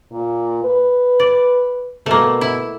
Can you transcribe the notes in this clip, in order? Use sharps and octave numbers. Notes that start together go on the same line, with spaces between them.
A#2
B4
D5
B2 A3 A#3
E4